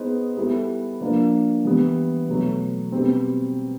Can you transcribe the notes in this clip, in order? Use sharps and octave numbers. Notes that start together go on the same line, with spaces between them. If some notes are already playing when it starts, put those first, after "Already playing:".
Already playing: B3 D#4 G#4 C5 D#5
G3 B3 E4 A4
F3 A#3 D4
E3 G3 B3
B2 F#3 A3
B2 G3 C4